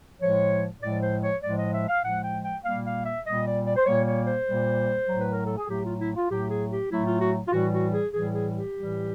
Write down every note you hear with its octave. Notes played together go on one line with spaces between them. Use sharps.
A2 F3 G#3 C#5
A2 F3 G#3 D5
C5
C#5
A2 F3 G#3 D5
D#5
E5
F5
A2 F3 G#3 F#5
G5
G5
A#2 G3 A#3 F5
F5
E5
A#2 G3 A#3 D#5
D5
D5
C5
A#2 G3 A#3 C#5
C#5
C5
A#2 G3 A#3
A2 F#3 A3
B4
A#4
A4
G#4
A2 F#3 A3 G4
F4
E4
F4
A2 F#3 A3 G4
G#4
G4
A2 F#3 A3 E4
F4
F#4
F4
A2 E3 G3 F#4
F#4
G#4
A2 E3 G3 G#4
G#4
G4
A2 E3 G3